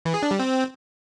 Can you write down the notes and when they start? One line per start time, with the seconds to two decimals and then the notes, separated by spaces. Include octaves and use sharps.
0.05 E3
0.14 G#4
0.22 D4
0.31 G3
0.39 C4